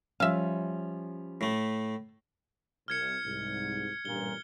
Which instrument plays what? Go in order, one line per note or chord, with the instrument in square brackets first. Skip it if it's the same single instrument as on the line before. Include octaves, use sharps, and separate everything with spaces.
[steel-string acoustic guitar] F3 G3 C#4 [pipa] E5 F5
[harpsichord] A2 A3
[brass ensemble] C2 [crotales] F6 G#6 C#7
[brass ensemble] C2 G#2
[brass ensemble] A1 G2 A#2 [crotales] G7